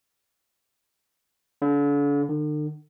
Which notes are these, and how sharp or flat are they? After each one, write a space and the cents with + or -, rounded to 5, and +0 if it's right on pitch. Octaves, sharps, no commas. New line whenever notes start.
D3 -40
D3 +45